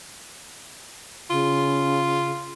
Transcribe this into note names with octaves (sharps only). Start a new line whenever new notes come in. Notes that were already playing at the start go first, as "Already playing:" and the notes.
C#3 F4